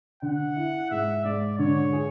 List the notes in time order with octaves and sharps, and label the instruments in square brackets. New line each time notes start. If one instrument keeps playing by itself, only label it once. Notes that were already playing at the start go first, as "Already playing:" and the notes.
[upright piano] D3 [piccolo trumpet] F#5
[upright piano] E4
[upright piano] G#2 [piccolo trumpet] E5
[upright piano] G#2 [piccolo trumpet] D5
[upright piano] D3 [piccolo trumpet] C#5
[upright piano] G#4